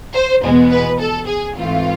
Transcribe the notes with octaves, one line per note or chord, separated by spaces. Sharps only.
C5
E2 B2 G#3 B3
B4
A4
G#4
G#2 E3 A3 C4 F4